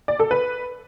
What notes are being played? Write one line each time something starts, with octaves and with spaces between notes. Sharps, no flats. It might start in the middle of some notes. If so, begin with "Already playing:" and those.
D5
A4
B4